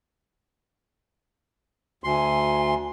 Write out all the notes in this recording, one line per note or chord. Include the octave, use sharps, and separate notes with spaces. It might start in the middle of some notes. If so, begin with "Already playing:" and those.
D2 G#5 C6